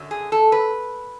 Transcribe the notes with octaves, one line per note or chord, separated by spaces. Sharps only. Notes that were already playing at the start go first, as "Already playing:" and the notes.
Already playing: F#2 D3 F#3
G#4
A4
B4